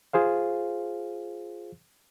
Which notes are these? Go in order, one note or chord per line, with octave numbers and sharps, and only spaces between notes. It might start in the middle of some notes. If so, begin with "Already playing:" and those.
F4 G#4 C5 F5